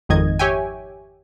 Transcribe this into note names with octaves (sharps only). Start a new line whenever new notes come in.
G#1 F2 D#3 D#5 G#6
G4 C#5 E5 G5 G#5